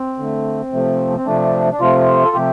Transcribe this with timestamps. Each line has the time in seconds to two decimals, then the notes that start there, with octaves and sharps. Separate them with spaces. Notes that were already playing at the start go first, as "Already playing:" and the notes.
Already playing: C4
0.19 D3 A3
0.73 C3 F3 A3
1.17 C4
1.26 C3 F3 A3 D4
1.72 D4
1.80 C3 F3 A3 F4
2.24 A4
2.34 C3 F3 A3 G4